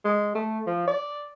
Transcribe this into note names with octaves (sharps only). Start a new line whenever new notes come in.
G#3
A3
F3
D5